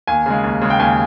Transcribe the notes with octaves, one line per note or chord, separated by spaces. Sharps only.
D#2 G#5
C#3 G#3
D#2
C#3 G#3
G5
D#2 G#5